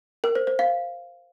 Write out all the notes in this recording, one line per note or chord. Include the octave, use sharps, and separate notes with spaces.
A#4
C5
C5
F5